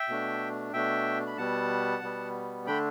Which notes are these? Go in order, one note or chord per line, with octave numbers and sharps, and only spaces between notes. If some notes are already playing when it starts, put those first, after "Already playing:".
Already playing: E5 G5
B2 A3 D4
B2 A3 D4 E5 G5
B5
B2 G3 B3 F#5 A5
B2 G3 B3
D3 A3 D4 G5 B5